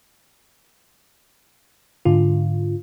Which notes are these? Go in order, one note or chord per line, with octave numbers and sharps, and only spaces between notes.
G#2 D3 F4